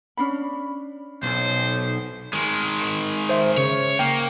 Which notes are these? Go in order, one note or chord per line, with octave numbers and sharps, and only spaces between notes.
C#4 D4 B5
B1 C5
D#3 G#3
C5 E5
C#3 C#5
A#3 G5